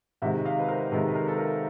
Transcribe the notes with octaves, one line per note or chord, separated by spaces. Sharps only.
C3 D#3 G#3 E5 F#5
D#5 F5
B4
A#4 C5
C3 D#3 G#3 A4 B4
B4
A#4
A4
A#4